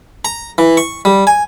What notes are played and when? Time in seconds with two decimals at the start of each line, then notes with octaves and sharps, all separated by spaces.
0.25 A#5
0.58 E3
0.77 C#6
1.05 G3
1.27 G#5